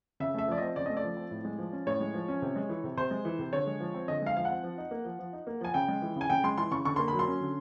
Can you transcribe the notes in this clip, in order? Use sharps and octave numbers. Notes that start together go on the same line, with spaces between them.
C#3 E5
A3 E5
F3 D5
C4 D#5
C#3 D5
A3 D#5
D5
F3
C4
A2
G#3
F3
C#4
A2 C#5
G#3
F3
C#4
C3
G#3
E3
C3
C3 C5
G#3
E3
C3
D3 C#5
G#3
F3
C4
D3 D#5
G#3 F5
F3 F5
C4 F#5
F3
D#4
A#3
F3
F3
D#4
A#3
F3 G#5
C#3 G5
G#3
E3
C#3
G#5
C#3 G5
G#3 C6
E3 C6
C#3 C#6
D3 C#6
A#3 C6
B5
F#3
C6
C#4
D3